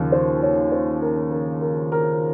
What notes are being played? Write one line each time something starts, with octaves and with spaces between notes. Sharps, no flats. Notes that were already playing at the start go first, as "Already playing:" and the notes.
Already playing: D#2 C#3 F3
C5
C#5
C5
A#4
A#4
A#4
A#4